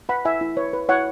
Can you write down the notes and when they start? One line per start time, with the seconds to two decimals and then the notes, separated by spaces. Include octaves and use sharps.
0.09 B4 F#5 B5
0.25 E4 E5 G#5
0.41 E4
0.57 B4 C#5
0.73 B4
0.89 E4 C#5 F#5